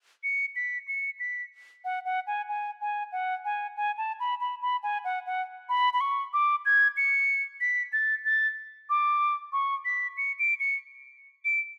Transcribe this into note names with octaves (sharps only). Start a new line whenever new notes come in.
C#7
B6
C#7
B6
F#5
F#5
G#5
G#5
G#5
F#5
G#5
G#5
A5
B5
B5
B5
G#5
F#5
F#5
B5
B5
C#6
D6
G#6
C#7
B6
A6
A6
D6
C#6
B6
C#7
D7
C#7
D7